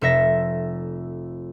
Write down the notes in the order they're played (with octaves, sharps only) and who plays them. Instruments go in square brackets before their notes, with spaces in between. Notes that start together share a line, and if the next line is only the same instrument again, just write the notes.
[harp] F1 A4 E5 A#6